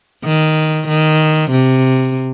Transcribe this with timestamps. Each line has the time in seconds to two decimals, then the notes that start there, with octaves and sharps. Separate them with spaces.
0.25 D#3
0.88 D#3
1.51 C3